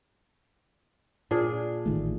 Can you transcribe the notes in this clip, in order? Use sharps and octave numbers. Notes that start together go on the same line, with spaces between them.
A#2 D4 G#4
A1 D#3 A3